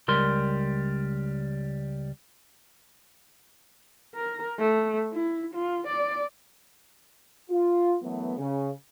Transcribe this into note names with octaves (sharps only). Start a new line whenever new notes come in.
C#2 G3 A#4 C6
A#4
A3
E4
F4
D5
F4
F#2 E3 F#3 A3 B3
C#3